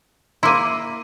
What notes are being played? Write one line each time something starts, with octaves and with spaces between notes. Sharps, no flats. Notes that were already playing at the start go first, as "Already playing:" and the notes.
A#3 E4 C6 D6 D#7